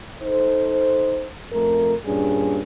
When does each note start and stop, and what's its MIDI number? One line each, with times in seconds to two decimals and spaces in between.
0.23 1.29 63
0.23 1.29 69
0.23 1.29 72
1.52 1.95 41
1.52 1.95 57
1.52 1.95 70
2.06 2.62 43
2.06 2.62 46
2.06 2.62 61
2.06 2.62 62
2.06 2.62 68